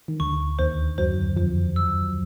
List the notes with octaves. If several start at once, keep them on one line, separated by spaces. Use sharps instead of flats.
D#3
D2 D3 C#6
D#2 D#3 C5
F#2 F#3 C5
F2 F3 C5
E6